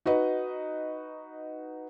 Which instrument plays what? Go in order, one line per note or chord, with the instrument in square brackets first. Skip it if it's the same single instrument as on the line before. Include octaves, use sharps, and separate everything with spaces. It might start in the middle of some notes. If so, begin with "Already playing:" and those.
[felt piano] D#4 F#4 B4 D#5